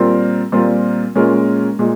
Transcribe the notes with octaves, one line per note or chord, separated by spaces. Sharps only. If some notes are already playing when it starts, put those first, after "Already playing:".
Already playing: A#2 G3 C4 F4 A#4
A#2 G3 C4 F4 A#4
A#2 G#3 C#4 F4 A#4
A#2 G#3